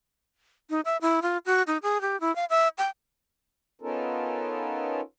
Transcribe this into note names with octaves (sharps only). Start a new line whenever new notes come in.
D#4
E5
E4
F4
F#4
D#4
G#4
G4
E4
F5
E5
G5
B3 C#4 D#4 F4 A4 A#4